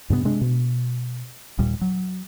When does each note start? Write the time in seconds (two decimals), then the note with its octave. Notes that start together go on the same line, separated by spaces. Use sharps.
0.10 G2 C3 B3
0.25 C3 G#3 D4
0.41 B2
1.59 D#2 A#2 G3
1.81 F#3